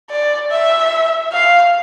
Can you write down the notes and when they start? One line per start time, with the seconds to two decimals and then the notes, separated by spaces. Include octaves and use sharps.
0.10 D5
0.51 E5
1.32 F5